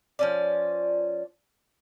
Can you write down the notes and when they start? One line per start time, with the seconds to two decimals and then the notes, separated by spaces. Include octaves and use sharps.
0.19 F3 C#4 D5